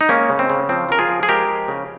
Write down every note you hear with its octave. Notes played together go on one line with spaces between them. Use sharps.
D#4
G#3 A#3 C#4
C#3
C4
C#3
F3 C4
F3 A#4
F4 G#4
F3
G#4
G#3 G4 A#4
F3
C#3